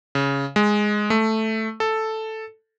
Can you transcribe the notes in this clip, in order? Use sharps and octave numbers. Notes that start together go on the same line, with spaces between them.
C#3
G#3
A3
A4